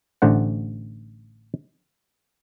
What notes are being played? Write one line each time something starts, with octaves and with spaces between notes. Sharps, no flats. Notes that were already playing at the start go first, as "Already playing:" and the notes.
A1 D3 C5 F#5